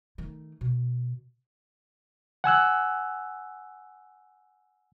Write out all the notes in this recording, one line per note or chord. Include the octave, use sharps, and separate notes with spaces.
D#3 A3
B2
F#5 G#5 E6 F#6